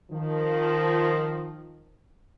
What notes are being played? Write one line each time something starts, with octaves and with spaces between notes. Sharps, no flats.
D#3 F3